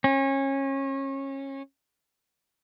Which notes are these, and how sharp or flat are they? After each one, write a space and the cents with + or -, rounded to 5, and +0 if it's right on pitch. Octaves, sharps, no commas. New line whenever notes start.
C#4 -25